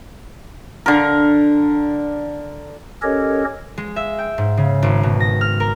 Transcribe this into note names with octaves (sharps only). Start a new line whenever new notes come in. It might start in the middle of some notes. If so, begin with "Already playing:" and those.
D3 A#4
C#4 G4 A4 A#4 C#5 D#5
G#3
E5
G5
G#2
C#3
G#1
B2
A#6
F6
A#4